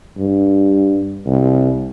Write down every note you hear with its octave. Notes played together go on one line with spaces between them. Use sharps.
G2
C2